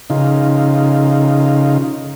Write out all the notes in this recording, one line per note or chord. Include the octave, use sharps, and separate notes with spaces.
C#3 D#4 F4